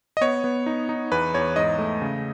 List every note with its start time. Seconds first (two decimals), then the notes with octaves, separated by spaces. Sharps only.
0.17 D#5
0.21 B3 C#5
0.44 B3
0.66 D#4
0.89 D#4
1.12 E2 B4
1.34 E2 C#5
1.56 G#2 D#5
1.78 A3
2.02 C#3